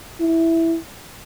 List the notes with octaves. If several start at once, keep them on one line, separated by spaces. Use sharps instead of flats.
E4